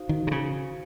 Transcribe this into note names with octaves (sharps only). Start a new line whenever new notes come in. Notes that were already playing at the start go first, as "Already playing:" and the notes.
Already playing: D#4 F#4 C5 F5
D#3
C3
C#3